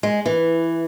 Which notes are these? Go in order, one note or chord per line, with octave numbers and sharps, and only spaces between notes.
G#3
E3